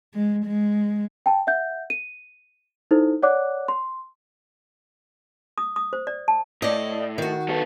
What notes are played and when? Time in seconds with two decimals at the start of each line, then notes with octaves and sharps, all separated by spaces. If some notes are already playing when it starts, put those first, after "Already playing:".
0.14 G#3
0.45 G#3
1.26 G5 A5
1.47 E5 F#5 G6
1.90 D#7
2.91 D#4 E4 A4 C5
3.23 C#5 D5 F#5 D6 F#6
3.68 C6
5.58 D#6
5.76 D#6
5.93 C5
6.07 D5
6.28 A5
6.62 A2 D5 D#5
7.18 D#3 F#4
7.49 B3 A4